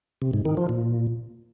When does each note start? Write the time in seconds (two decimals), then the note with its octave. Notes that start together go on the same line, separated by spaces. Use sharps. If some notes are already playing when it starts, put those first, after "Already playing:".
0.22 C3
0.34 G#2
0.45 D#3
0.57 F3
0.69 A#2